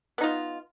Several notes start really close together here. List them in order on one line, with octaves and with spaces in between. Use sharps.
B3 D#4 F4